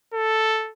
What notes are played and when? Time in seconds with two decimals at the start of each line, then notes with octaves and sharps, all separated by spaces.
0.14 A4